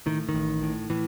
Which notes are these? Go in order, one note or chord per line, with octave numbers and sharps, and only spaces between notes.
A2 D#3
D#3
A1
A2
A2 E3